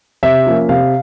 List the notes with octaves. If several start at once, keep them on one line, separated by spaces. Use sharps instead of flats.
C3 E5
F3 A#3 C#4
C3 F5